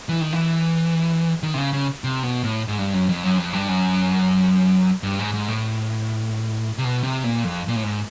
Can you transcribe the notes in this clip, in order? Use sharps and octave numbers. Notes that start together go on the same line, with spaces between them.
E3
D#3
E3
D#3
C3
C#3
C#3
C3
B2
A2
G#2
G2
F#2
F2
F#2
F2
G2
F#2
G2
G#2
G#2
A2
C3
B2
C3
A#2
F2
A#2
A2
G#2